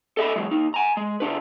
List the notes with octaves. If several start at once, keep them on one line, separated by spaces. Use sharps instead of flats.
A4 D#5 E5 B5
E3 F#3 G#3
D#2 D#4
G#5 A#5
G#3
C#3 F3 D4 B4